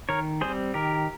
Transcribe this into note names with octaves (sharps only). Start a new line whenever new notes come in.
D#3 A#4 C#5
G3 C4 G#4 C5
D#3 G4 A#4